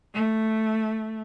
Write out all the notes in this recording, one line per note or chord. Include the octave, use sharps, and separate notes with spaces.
A3